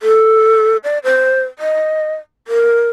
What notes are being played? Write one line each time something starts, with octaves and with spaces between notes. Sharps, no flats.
A4
D5
C5
D#5
A#4